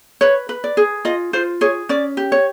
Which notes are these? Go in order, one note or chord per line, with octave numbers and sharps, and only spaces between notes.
B4 C#5
B4
D5
G#4
F4 D#5
F4 C5
G#4 C#5
C#4 D5
G4
C#5